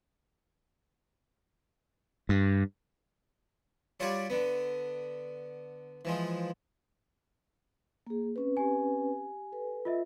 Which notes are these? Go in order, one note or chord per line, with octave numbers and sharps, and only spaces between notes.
G2
F#3 G3 F4 G4 C#5 D5
D3 B3
E3 F3 G#3
A#3 G#4
C4 C#4 B4
G4 G#5
A4 B4
F4 D#5 E5